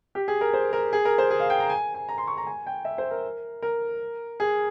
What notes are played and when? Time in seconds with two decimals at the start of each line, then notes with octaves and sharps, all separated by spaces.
0.15 G4
0.28 G#4
0.41 A#4
0.53 C5
0.73 A#4
0.93 G#4
1.05 A#4
1.18 C5
1.31 G#4
1.40 F5
1.50 G5
1.60 A#5
1.70 G#5
1.94 G#5
2.09 A#5
2.18 C6
2.27 C#6
2.38 A#5
2.47 G#5
2.67 G5
2.85 E5
2.98 C5
3.11 A#4
3.62 A#4
4.40 G#4